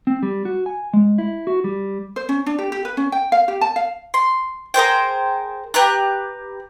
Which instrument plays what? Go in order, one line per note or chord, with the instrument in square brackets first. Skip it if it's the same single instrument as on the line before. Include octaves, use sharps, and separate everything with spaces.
[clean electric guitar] C4
G3
F#4
G#5
G#3
E4
F#4
G3
[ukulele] C5
C#4
D4
G4
G4
B4
C#4
G5
F5
G4
A5
F5
[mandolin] C6
G#4 A#4 C5 G5
G4 B4 A#5 F#6